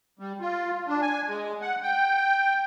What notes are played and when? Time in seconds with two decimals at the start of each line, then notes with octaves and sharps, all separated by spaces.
0.19 G3
0.41 F4
0.88 D4
1.02 G#5
1.28 G#3
1.61 F#5
1.83 G5